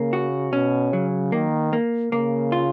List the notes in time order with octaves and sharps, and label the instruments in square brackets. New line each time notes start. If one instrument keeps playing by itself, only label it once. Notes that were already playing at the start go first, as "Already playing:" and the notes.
Already playing: [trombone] C#3 [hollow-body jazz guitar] A#3
[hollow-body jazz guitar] F#4
[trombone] B2 [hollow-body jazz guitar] C#4
[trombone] C#3 [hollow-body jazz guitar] F#3
[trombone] D#3 [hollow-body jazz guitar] A#3
[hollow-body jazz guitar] A#3
[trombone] C#3 [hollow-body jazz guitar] A#3
[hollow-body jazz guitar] F4